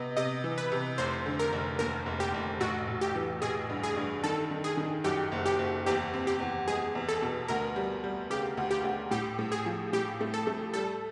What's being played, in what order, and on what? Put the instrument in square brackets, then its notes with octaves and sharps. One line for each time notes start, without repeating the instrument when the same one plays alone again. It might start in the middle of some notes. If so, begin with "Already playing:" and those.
Already playing: [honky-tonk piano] C3 B3 [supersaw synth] D#5
[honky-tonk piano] C3 [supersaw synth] D#5
[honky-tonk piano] E3
[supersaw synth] B4
[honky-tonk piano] C3
[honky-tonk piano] F1 [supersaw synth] C5
[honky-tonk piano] D3
[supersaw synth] A#4
[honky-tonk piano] F1
[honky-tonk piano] D#2 [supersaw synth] A#4
[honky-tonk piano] F1
[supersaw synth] G4
[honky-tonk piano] F1
[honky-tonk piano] A1 [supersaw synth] F#4
[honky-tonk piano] A1
[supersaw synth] G4
[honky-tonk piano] E3
[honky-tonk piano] A1 [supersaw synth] G#4
[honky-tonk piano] G2
[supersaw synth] G#4
[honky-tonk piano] G2
[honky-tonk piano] D#3 [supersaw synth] A4
[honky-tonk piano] D#3
[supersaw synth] G#4
[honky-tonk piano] D#3
[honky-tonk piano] F#2 [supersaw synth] G4
[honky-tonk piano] F#1
[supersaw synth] G4
[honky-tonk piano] F#1
[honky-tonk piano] E2 [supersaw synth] G4
[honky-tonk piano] C4
[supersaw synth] G4
[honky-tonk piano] E2
[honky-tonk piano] G#3 [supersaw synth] G#4
[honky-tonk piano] E2
[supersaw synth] A4
[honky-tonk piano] B2
[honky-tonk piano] D2 [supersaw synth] A#4
[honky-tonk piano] G3
G3
[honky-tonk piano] C#3 [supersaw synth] G4
[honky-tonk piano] D2
[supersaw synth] G4
[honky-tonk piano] D2
[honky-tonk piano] A2 [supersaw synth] G4
[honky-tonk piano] A2
[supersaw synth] G#4
[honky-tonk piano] F3
[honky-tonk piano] A2 [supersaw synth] G4
[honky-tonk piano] A3
[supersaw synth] A4
[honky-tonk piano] A3
[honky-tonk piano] G3 [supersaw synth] A4